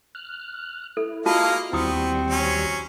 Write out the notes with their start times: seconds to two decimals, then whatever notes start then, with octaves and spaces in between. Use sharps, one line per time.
0.15 F6 F#6
0.97 E4 A4
1.26 G#3 A#3 F4 F#4 D#5 F5 A5
1.73 D#2 G3 B3 C4 E4 C#6 D#6
2.31 F#3 C#4